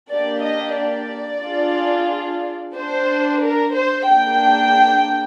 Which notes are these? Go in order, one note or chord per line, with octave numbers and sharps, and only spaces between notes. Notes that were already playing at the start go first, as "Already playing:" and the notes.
A#3 D4 G4 D5
D#5
D5
D4 F4 G#4
D4 G4 C5
A#4
C5
A#3 D4 G#4 G5